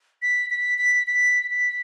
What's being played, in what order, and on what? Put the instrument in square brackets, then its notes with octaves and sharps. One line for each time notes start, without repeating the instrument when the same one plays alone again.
[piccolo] B6
B6
B6
B6
B6